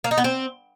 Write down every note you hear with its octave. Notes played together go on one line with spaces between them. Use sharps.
A#3
D#4
B3
C4